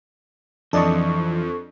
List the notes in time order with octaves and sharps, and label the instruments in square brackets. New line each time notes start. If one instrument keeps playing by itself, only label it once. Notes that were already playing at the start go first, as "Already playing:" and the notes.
[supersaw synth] F2 [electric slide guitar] E3 F3 [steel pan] D4 D5 D#5 [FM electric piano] A4 C#6